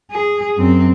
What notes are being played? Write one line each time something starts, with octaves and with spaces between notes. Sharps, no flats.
G#4
F#2 C4